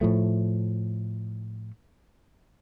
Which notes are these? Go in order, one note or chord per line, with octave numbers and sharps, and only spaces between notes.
A2 F3 A3